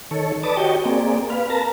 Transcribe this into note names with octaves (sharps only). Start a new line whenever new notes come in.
D#3 A4 C#5
B4 D5 A5 D6 D#6
F#4 G4 C#5 D#5 G5
A#3 C4 G#4 D5
B4 F5
A#4 B4 A5 A#5